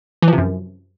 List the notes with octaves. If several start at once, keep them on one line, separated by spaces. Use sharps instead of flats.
E3
F3
C3
F#2